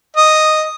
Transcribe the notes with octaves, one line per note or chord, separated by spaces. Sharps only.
D#5